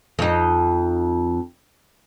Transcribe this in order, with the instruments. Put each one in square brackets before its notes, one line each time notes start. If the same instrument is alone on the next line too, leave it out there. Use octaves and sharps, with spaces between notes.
[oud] F2 D#4